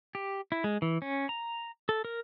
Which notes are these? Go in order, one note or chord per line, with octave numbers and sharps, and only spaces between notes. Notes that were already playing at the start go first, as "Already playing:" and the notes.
G4
E4
G#3
E3
C#4
A#5
A4
A#4